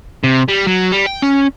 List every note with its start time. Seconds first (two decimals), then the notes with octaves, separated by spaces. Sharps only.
0.24 C3
0.48 G3
0.67 F#3
0.92 G3
1.06 G5
1.22 C#4